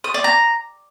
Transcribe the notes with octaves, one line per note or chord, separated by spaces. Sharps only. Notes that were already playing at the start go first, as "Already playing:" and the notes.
D#6
D5
A#5